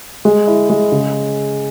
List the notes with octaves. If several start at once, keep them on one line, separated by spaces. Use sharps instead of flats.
G#3
E4
G#3
C#3